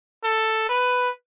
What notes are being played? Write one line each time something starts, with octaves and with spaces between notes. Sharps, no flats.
A4
B4